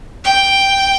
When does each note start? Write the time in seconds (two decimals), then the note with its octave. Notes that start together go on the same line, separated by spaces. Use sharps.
0.24 G5